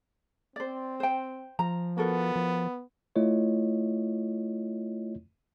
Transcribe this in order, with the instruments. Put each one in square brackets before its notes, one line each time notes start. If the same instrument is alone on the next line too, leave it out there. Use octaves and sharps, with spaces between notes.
[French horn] C4 [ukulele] C5 D5
[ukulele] C5 G5
[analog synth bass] F3 [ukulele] A#5
[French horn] B3 [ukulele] F#4 A4 A#4
[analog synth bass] F3
[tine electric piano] A3 E4 F4 C#5 D#5